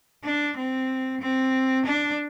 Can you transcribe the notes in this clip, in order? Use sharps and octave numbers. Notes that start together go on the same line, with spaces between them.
D4
C4
C4
D4